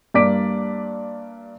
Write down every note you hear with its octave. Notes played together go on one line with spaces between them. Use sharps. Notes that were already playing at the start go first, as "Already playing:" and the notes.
G2 A#3 D5 D6 B6 D7